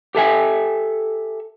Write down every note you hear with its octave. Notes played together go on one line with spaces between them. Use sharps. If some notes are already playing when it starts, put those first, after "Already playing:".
G4 A4 E5 G#5